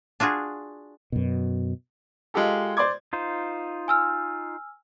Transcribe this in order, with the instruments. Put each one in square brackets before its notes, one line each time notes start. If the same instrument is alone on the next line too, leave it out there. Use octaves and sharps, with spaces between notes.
[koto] D4 F4 F#4 G#4
[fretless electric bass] F#2 B2
[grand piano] G#3 F4 G4 A4
C5 D5 C6 D6 G#6
[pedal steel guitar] D#4 F4 C5
[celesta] G#5 E6 F6